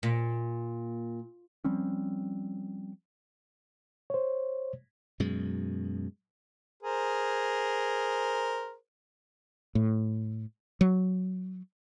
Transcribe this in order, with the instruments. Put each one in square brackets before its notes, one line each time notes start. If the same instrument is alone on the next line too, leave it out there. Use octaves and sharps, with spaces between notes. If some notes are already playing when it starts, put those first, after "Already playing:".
[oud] A#2
[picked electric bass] F3 G3 C4 C#4
[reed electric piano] C5 C#5
[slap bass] F#2 B2 G#3
[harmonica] G#4 A#4 C5
[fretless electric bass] A2
F#3